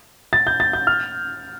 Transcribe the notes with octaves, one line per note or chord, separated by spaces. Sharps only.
A6
G6
A6
G6
F6